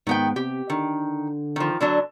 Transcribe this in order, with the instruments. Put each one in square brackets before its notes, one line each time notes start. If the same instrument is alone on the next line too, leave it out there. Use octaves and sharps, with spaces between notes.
[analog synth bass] G#2 [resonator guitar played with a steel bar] D#3 B3 G5
[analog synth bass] C3 [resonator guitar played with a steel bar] G4
[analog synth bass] D3 [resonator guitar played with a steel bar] D#3
[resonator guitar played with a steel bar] D#3 F3
D3 F#3 D4